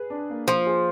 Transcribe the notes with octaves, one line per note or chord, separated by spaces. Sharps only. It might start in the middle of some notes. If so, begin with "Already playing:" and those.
Already playing: G#4 B4
D4
A#3
F3 F4
G#4